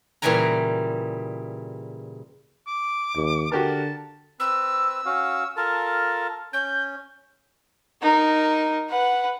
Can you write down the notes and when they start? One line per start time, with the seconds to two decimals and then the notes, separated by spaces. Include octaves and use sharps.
0.22 A#2 C#3 E3 G3 G#5 A#5
2.67 D6
3.15 D#2
3.52 D3 F#4 G4 A#4 A5
4.40 C4 B4 E6
5.06 C#4 F#4 F5
5.57 F4 A4 A#4 A5
6.53 C#4 G6
8.02 D#4 A#4
8.90 B4 F#5